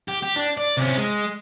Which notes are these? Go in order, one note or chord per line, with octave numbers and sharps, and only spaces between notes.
G4
G4
D4
D5
C3 C#4
G#3